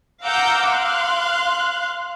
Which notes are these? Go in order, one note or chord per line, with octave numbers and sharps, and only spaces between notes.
F5 F#5 A#5 D6 E6 G6
F5 C6 F#6